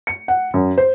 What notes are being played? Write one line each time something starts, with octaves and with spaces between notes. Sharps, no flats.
C#7
F#5
F#2
C5